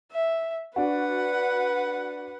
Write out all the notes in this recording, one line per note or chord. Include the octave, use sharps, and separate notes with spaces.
E5
D4 F#4 B4 F#5